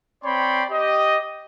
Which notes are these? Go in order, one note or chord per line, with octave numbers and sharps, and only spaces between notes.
C4 C#5 D5 G5 B5 C6
G4 D#5